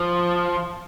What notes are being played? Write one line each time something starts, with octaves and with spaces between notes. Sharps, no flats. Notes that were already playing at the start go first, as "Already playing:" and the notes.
Already playing: F3